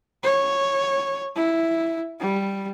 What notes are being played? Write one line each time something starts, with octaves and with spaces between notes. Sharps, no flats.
C#5
E4
G3